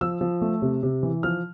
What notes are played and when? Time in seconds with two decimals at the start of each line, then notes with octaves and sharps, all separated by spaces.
0.01 F3 E6
0.21 F3
0.42 A3
0.62 C3
0.83 C3
1.03 E3
1.23 F3 F6